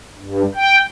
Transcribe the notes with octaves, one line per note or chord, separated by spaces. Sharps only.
G2
G5